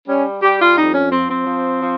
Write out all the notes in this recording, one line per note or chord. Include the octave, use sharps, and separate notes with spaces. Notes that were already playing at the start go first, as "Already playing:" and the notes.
G3 C#4
G3 G4
F4
F2 D#4
C#4
F3 C4
C4
F3
F3